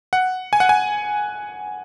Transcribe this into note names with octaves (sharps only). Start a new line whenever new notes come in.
F#5
G#5
F#5
G#5